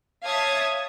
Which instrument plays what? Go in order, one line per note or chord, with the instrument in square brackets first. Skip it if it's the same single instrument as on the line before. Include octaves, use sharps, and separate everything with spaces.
[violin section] C#5 E5 F5 A5 D#6 G#6